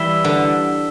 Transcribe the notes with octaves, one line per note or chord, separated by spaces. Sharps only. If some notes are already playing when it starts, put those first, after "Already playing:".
Already playing: E3 G3 E6 B6 E7 G7
D3